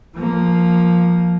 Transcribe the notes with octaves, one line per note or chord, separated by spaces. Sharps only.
F3 A#3